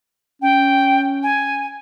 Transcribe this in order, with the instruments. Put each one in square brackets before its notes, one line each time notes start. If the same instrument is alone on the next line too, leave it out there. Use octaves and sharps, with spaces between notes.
[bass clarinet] C#4 [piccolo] G5
[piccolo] G#5